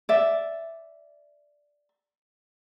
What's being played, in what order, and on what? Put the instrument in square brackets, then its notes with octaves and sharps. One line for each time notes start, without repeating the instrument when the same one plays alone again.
[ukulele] D5 E5